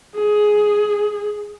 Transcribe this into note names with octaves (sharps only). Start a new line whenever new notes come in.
G#4